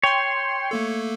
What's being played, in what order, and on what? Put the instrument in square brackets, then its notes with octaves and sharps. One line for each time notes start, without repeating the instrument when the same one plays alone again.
[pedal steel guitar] C#5 [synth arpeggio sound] G5 C6
[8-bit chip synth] A3 A#3 A4